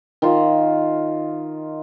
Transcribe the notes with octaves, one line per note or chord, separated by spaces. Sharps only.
D#3 F4